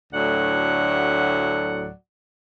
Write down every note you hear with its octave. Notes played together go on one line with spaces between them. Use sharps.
D2 A2 F#3 D5 F#5